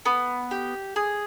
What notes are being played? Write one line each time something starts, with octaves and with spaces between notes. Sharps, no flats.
B3
G4
G#4